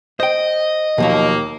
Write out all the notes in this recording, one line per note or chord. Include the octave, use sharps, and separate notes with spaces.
C5 D#5 G5
D#2 B2 F3 F#3 A#3